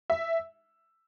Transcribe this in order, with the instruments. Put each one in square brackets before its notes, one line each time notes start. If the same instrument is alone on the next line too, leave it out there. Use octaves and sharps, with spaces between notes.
[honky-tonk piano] E5